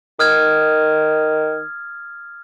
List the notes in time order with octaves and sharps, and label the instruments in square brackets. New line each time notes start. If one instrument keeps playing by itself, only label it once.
[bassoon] D#3 [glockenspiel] D#6 F6 G#6